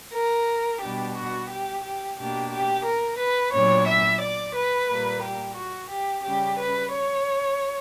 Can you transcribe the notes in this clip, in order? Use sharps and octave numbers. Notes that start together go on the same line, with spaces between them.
A#4
B2 G3 B3 D4 G4
F#4
G4
G4
B2 A#3 D4 G4
G4
A#4
B4
A#2 F#3 B3 D4 C#5
E5
D5
B4
A#2 G3 A#3
G4
F#4
G4
C#3 G3 C#4 G4
B4
C#5